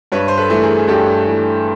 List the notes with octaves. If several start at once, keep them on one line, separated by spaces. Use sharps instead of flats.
G2 B4 C#5
C5
A4 B4
E3 A3
G#4 A#4
G#4
G2 G4 A4
E3 A3